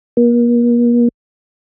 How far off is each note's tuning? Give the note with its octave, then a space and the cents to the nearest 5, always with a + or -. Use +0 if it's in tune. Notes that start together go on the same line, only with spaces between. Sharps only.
A#3 +40